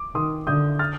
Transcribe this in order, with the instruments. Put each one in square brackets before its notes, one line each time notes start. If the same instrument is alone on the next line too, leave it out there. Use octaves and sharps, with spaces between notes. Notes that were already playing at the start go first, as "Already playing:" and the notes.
Already playing: [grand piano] D6
[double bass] D#3 [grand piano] C6 D#6
[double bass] D3 [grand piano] D#6 G6
[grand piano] F6 A6